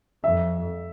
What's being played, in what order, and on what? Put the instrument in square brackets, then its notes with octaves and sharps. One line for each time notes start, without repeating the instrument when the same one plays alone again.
[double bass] F2 [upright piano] E5